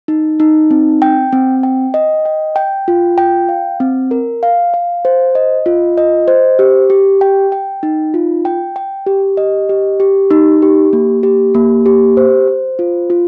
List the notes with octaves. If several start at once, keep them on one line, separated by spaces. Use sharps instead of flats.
D#4
D#4
C4
G5
C4
G5
D#5
G5
G5
F4
G5
F5
C4
A#4
F5
F5
C5
D#5
F4
D#5
C5
G4
G4
G5
G5
D#4
F4
G5
G5
G4
D#5
G4
G4
D#4
G4
A#3
G4
A#3
G4
C5
C5
F4
F4